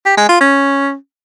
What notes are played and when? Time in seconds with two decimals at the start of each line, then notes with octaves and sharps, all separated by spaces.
0.06 G4
0.17 G#3
0.29 F4
0.41 C#4